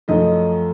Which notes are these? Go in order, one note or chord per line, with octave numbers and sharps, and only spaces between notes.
F#2 F3 A3 D#5